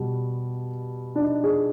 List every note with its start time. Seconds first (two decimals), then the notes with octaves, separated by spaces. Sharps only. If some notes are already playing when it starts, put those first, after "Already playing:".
Already playing: B2 G3
1.15 D4
1.21 D#4
1.44 G#4